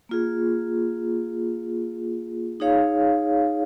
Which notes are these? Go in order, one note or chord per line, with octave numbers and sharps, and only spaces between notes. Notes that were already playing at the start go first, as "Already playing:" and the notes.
A#3 F4 G#4
D#4 G#4 C#5 F5